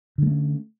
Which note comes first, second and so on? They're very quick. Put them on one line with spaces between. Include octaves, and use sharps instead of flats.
D3 G#3 A3 C#4